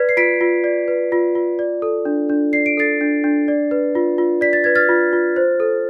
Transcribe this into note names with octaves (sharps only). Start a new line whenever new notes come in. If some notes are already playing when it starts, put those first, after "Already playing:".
Already playing: B4 D5 G#6 B6
C7
F4 B6 D7
F4
D5
B4
F4
F4
D5
A4
D4
D4
D5 C7
D7
A4 A6 C7
D4
D4
D5
B4
F4
F4
D5 B6
A6
B4 G#6
F6 A6
F4
F4
C5
A4